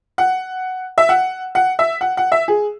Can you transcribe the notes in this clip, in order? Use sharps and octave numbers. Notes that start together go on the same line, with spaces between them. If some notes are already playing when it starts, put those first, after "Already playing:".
F#5
E5
F#5
F#5
E5
F#5
F#5
E5
G#4